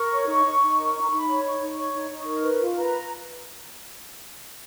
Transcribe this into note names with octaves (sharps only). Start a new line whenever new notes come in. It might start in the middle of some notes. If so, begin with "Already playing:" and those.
Already playing: A#4 C#6
C#5
D#4
D#4
D#4
A#4
D#4
A#5
D#4 B5
C#5
D#4 C#6
D#4
C#5
D#4
D#4
A#4
B4
F4
B4 A#5